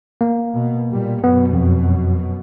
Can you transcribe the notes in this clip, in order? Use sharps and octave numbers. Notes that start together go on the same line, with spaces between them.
A#3
B2
A#2 G3
F#2 B2 B3
F2